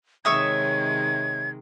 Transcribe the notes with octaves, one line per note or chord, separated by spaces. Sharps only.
C3 D#3 G#3 C#5 E5 D#6 G#6